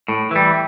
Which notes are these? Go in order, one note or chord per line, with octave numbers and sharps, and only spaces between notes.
A2
E3 G3